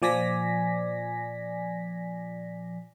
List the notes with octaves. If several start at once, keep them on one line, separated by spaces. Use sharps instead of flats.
A#2 F3 D5 G#5 A#6 B6